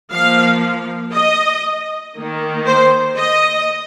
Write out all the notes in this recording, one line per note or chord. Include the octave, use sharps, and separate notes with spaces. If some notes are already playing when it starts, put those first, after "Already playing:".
F3 A#3 F5
D#5
D#3 A#3
C5
D#5